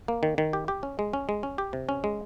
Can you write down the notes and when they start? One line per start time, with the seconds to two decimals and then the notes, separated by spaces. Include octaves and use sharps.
0.08 A#3
0.23 D#3
0.38 D#3
0.53 G4
0.68 G4
0.83 C#4
0.99 G#3
1.13 C#4
1.29 G#3
1.43 C#4
1.58 G4
1.73 C3
1.89 C#4
2.04 G#3